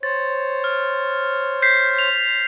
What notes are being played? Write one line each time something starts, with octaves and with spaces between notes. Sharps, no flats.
C5 C#5 A6
F6
G6 B6 C7
F7